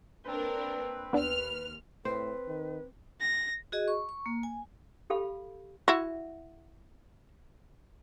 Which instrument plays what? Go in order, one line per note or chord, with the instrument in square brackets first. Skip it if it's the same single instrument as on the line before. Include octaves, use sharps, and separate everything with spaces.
[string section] A#3 D4 A#4 [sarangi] C4 [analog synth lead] B4
[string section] D#2 F6 [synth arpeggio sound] B3 D4
[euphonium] A2 [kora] C4 C5 [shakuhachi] B4
[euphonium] D#3
[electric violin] A#6
[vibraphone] F#4 G#4 D#5
C#6
C#6
A#3
G#5
[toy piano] G4 A4 F5 B5
[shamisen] E4 F#4